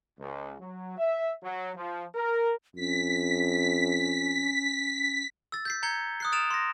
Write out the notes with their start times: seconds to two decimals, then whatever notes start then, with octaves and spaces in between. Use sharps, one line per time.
0.19 C#2
0.60 F#3
0.98 E5
1.43 F#3
1.76 F3
2.15 A#4
2.76 F2 C#4 B6
5.52 E6 A6
5.65 G6 B6 C7
5.83 A#5 G6 G#6 C7 C#7 G7
6.20 D#6 F#6 C7
6.32 D#6 F6 A6 D7 E7 F7
6.51 C6 A#6